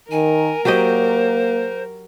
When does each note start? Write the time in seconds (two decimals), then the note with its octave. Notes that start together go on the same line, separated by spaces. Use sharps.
0.11 D#3 A#4 G#5
0.65 F#3 A#3 G4 C5 D#5